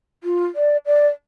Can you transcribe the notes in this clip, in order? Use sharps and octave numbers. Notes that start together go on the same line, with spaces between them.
F4
D5
D5